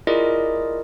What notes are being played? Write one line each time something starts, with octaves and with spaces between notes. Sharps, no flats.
E4 F4 G#4 A#4 D5 D#5